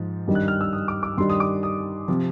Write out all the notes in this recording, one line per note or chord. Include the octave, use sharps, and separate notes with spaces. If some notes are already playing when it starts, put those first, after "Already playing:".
Already playing: G#2 F3
G2 D#3 G3
F#6
F6
E6
D#6
D6
D6
G2 D#3 G3 C6
D#6
D6
D#6
C3 F3